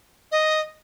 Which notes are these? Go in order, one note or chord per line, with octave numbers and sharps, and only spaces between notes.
D#5